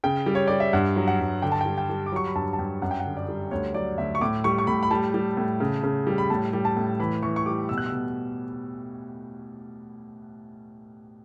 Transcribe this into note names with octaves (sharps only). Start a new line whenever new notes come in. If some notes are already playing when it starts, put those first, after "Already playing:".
C#3 G5
G3
C#5
G3 D5
E5
G2 F#5
F#3
F#5
G2
D3 G5
A5
G3 G5
G5
G3
D6
F#3 C#6
B5
G2 A5
A5
G2 G5
F#2 F#5
G5
F#5
D3
D5
G3
D2 C#5
F#3 D5
D2 E5
C#6
A2 D6
G3 C#6
C#6
A2 B5
B5
G3 A5
G3
A2
C#3
C#3
G3
B5
A2 A5
G3
A5
A2
E3 B5
E3 C#6
C#6
G3 D6
B2 E6
F#6
E6
B2